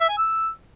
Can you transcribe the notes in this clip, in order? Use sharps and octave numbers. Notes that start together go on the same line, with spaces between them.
E5
G#5
E6